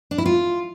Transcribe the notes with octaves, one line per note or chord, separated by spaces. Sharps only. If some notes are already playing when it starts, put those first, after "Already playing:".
D4
E4
F4